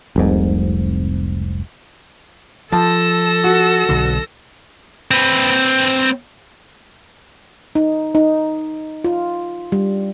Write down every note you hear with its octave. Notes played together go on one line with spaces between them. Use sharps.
F1 C2 G#2
F3 A4 A5 E6 A#6
F#4
B1 D3
C4 B4
D#4
D#4
F4
G3